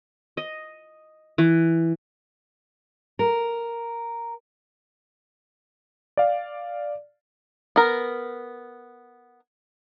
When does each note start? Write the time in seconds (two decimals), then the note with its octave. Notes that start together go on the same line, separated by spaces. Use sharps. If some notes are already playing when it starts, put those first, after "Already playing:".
0.37 D#5
1.38 E3
3.19 A#4
6.17 D5 F5
7.76 B3 A#4